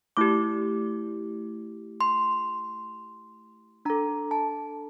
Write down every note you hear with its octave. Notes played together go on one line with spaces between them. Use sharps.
A3 E4 G4 D6
C6
D4 A4 A#5
A5